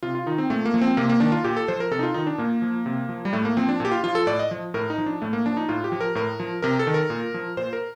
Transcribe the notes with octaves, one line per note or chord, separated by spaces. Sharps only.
C3 F4
F4
D#3 D#4
C4
A#2 A3
A#3
F3
C4
C3 A#3
A#3
D#3 D4
F4
A#2 G4
A4
F3 C5
A#4
C3 A4
D#4
F4
D#3 D#4
D4
A#2 A#3
F3
C3
F3
G3
A2 A3
A#3
F3 C4
D4
A#2 G4
F4
F3 F4
A4
A2 D5
D#5
F3
A2 A#4
D#4
F3
D4
A2 A3
A#3
F3 D4
D#4
A2 F4
G4
F3
A#4
A2 A#4
F3
C3 A#4
A4
D#3
A#4
A#2
F3
A#2 C5
A#4